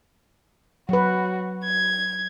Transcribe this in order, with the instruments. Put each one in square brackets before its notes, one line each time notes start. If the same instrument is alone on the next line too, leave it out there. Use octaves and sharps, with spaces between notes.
[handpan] F#3 B4 [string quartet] F#4
[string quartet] G#6